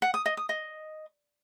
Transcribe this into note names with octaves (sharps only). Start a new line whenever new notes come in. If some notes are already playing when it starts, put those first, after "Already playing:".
F#5
D#6
D#5
D#6
D#5